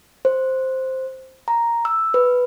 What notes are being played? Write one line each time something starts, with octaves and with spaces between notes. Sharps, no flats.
C5
A#5
E6
B4